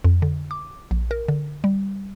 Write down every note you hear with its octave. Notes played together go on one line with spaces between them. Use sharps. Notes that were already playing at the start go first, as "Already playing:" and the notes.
F2
D3
D6
A#1
A#4
D3
G3